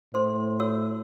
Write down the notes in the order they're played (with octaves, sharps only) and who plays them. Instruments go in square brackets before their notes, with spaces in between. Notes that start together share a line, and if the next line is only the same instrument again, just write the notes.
[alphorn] A2 [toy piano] C5 C6
[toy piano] F#4 C#5 E6